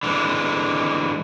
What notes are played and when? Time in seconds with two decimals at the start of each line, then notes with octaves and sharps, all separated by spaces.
0.03 D3 E3 G#3 A#3